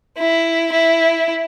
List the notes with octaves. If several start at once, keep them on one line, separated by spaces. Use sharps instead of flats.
E4
E4